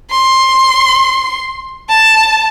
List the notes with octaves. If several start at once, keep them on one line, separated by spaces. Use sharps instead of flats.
C6
A5